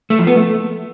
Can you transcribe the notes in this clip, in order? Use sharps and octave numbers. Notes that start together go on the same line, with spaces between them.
A3
F3
B3
A3